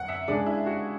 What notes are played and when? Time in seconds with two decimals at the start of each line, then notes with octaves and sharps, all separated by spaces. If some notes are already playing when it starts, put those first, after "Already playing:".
Already playing: F#2 F#5
0.08 E5
0.28 C#3 G#3 D4 G#4 D5
0.46 E4
0.66 F#4